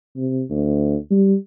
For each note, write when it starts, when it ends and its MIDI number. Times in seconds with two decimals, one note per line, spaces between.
0.16 0.42 48
0.50 0.96 38
1.11 1.35 55